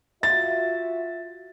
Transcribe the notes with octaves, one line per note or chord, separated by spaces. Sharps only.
F4 F#4 E5 A6